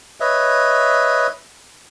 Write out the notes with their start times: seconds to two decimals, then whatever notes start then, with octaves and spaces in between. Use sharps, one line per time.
0.20 B4 C#5 D#5 E5